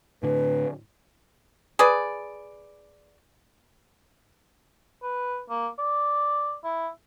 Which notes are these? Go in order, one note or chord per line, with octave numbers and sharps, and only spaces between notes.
A2 D3 B4
G#4 B4 D5
B4
A#3
D5
E4